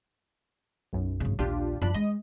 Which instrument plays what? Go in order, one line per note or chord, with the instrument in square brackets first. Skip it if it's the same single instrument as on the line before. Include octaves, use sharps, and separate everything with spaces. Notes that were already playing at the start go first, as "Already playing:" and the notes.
[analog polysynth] B1 F#2
[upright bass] G#1 C#3
[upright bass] A#1 D#2 [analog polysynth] D4 F4 G4
[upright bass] F#2 F3 [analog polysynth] D4 B5
[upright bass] G#3 [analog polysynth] D#5